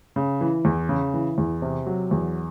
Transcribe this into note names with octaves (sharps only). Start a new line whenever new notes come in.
C#3
E3
E2
C#3
E3
E2
C3
F#3
E2